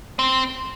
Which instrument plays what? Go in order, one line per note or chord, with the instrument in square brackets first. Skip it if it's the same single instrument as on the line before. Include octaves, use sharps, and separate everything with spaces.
[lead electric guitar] C4